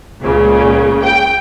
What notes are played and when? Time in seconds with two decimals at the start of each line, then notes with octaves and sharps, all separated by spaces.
0.22 C#2 A#2 C#3
1.02 G5